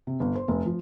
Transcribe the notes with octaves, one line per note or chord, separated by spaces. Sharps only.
C3
G1
C5
F1
F3